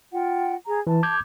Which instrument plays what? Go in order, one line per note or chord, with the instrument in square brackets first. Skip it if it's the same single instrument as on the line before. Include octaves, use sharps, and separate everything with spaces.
[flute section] F4 F#5 G5
G#4 A#5
[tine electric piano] E3 [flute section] A5
[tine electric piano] D6 G6 G#6